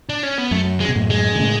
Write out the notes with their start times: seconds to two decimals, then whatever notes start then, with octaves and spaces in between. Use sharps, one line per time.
0.10 D4
0.23 C#4
0.38 B3
0.51 F#2 A3
0.80 G#3
0.89 B2
0.95 F#2 A2
1.10 G#3
1.35 D3
1.39 A2 C#3